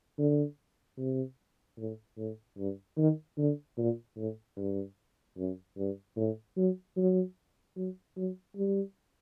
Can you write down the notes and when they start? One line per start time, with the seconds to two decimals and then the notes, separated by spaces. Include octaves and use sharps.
0.19 D3
0.98 C3
1.78 A2
2.18 A2
2.58 G2
2.98 D#3
3.38 D3
3.78 A#2
4.17 A2
4.57 G2
5.37 F#2
5.78 G2
6.17 A2
6.57 F#3
6.97 F#3
7.77 F#3
8.17 F#3
8.56 G3